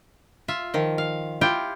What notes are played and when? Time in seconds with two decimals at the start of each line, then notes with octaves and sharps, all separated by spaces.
0.48 F4 E5
0.74 D#3 F3
0.98 F5
1.41 E4 F4 G4 G5